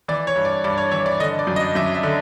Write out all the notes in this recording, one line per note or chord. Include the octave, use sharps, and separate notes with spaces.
E3 D5
C#5
G2
D5
G2 D5
C#5
E3 C#5
D5
D3 D#5
D5
F#2
D#5
F#2 E5
E5
D3